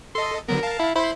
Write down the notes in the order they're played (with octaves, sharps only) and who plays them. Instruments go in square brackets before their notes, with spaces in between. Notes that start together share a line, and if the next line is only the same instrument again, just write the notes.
[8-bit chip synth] A4 D#5 [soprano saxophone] C6
[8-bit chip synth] D3 F#3 B3 [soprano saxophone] A#4
[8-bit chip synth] F5 A5
[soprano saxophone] E4
[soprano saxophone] E4 [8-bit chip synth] C5 B5 C6